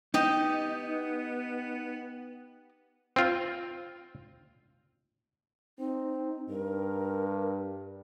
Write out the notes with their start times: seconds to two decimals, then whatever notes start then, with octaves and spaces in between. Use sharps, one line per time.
0.14 B3 D#4 G4 D#5
3.16 C4 F4
5.79 C4 D#4
6.49 G2 A#4